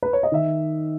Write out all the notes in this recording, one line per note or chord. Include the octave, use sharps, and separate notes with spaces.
B4
C#5
D#5
D#3 E5